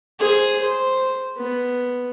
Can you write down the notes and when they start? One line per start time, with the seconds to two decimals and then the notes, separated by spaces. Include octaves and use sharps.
0.20 G#4 C5
0.62 C5
1.38 B3